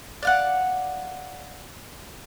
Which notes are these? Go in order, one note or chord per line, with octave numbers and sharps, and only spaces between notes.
D5 F5 F#5